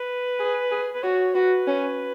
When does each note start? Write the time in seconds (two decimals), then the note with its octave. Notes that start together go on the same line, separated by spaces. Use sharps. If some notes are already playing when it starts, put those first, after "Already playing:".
Already playing: B4
0.39 G#4
0.71 G#4
0.95 B4
1.03 F#4 C#5
1.35 F#4 B4
1.67 C#4